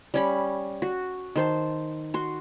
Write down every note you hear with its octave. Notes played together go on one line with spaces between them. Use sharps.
G3 C#4 B5
F#4
D#3 C5 A5
F#4 C6